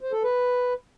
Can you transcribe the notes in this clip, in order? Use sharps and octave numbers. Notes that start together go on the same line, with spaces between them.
C5
A4
B4